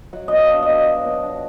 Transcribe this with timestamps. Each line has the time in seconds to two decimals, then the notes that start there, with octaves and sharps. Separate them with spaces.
0.13 F#3 F#5
0.28 B2 D#5
0.38 F5
0.50 D4
0.62 D#5
0.68 B2
0.86 F#3
1.05 B2
1.24 D4